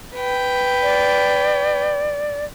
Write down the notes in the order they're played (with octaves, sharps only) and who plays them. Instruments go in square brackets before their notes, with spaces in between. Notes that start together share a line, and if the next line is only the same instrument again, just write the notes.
[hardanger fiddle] B4 G5
[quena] D5